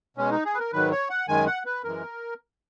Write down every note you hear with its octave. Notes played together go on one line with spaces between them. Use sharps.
B2 G#3 C#4
D#4
G#4
B4
A#4
G#2 D#3 F#3 B4
C#5
F#5
F#2 D#3 G#3 G#5
F#5
B4
F#2 E3 G#3 A#4